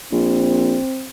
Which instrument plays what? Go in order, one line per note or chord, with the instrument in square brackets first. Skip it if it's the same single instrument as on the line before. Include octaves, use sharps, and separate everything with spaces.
[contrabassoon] A#1 [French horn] C4